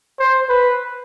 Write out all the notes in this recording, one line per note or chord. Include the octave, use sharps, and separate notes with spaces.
C5
B4